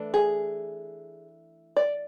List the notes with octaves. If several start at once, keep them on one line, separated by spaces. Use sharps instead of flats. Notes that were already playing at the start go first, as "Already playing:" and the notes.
Already playing: E3 A3 D4
G#4
D5